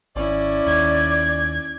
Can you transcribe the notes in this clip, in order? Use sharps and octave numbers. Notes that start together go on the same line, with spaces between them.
G#1 C#4 E4 D5
D#2 G#6